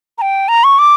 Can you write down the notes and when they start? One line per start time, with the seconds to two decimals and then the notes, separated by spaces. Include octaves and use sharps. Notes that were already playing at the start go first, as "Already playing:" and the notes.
0.18 A#5
0.22 G5
0.48 A#5
0.64 C#6
0.79 D6